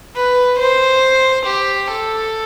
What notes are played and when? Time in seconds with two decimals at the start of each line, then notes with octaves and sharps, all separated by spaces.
0.16 B4
0.59 C5
1.46 G4
1.91 A4